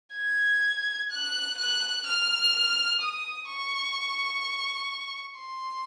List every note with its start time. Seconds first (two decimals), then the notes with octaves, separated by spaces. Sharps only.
0.15 G#6
1.11 F#6
1.58 F#6
2.06 F6
3.01 D#6
3.48 C#6
5.39 C6